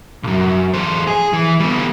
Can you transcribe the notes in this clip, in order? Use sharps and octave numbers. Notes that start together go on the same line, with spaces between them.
B1 F#2
E2 C5
G#4
E3
G3 B3